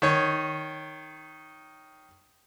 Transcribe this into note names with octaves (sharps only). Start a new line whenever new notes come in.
D#3 C#5